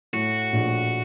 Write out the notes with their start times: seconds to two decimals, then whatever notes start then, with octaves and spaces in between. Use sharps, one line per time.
0.13 A2 F#4
0.53 A#1